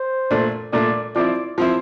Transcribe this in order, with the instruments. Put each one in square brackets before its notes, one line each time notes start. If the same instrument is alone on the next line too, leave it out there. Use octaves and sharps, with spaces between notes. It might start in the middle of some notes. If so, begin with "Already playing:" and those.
Already playing: [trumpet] C5
[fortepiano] A#2 A3 D4
[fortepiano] A#2 A3 D4 [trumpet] D5
[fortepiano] F3 C4 E4 [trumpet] D5
[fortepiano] F3 C4 E4